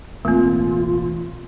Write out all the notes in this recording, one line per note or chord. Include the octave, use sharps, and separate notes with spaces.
E1 A1 A3 A#3 C4 F4